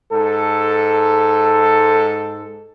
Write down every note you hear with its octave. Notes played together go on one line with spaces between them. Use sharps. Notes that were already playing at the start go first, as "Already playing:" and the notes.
G#2 A4